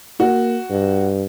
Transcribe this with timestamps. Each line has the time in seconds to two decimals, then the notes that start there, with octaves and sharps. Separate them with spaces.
0.20 A#3 F#4
0.70 G2